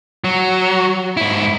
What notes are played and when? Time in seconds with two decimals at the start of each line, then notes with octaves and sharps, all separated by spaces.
0.24 F#3
1.17 G#2 E4